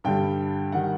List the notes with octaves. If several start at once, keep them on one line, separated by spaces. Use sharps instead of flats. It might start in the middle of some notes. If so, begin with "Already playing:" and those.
G2 D3 G3 G5
D#3 G3 F#5